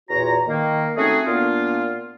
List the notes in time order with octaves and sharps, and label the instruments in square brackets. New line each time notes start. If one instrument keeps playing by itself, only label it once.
[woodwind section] E2 A#2 F#4 C#5 A#5
D#3 A#3
A3 C4 C#4 D#4 F#4 G#4
A#2 A#3 B3 D4 F4